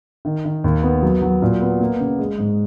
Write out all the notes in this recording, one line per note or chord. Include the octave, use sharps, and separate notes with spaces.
D#3
D#3
D#2
B3
F#3
F#3
A#2
B3
A#3
C#3
G#3
G#2